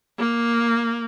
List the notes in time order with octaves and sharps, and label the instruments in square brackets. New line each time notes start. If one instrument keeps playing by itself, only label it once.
[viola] A#3